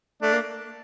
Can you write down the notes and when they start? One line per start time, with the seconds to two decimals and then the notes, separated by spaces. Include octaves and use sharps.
0.22 A3 D4
0.33 A#3